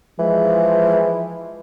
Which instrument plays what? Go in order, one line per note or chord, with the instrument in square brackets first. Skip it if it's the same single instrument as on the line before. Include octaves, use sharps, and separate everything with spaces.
[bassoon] E3 [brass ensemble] F3 G#3